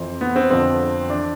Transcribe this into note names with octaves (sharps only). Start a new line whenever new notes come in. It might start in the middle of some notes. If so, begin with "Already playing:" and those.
Already playing: F2 E3 C4
B3
C4
F2 D3 F3 C4
E3 D4